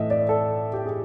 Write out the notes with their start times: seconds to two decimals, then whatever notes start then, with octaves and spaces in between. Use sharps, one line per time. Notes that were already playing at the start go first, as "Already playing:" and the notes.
Already playing: A2 E3 A3 D#5 E5
0.10 D5
0.29 A4
0.73 G4
0.86 G#4